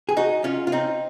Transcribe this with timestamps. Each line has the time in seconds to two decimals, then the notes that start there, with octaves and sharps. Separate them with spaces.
0.09 G#4
0.17 D#4 F#4
0.44 C#4 F4
0.67 F4
0.72 C4 D#4